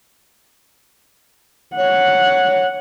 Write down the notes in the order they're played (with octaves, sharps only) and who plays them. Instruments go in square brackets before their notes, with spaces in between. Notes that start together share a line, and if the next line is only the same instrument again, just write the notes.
[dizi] C#5 [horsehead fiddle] F#5